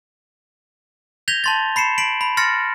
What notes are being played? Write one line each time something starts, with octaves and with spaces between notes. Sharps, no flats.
G6 G#6 A#6 B6 F7 G7
A5 C6 A6
B5 C7 C#7 E7
B6 C7 D7 F#7
B5
C6 F6 A6 A#6 C#7